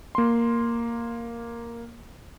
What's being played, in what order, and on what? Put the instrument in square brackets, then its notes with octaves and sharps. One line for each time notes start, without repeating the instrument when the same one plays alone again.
[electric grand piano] A#3 C6